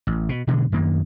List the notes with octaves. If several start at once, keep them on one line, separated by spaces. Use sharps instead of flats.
A1
B2
B2 D3 E3 G#3
F#2 D#3 A#3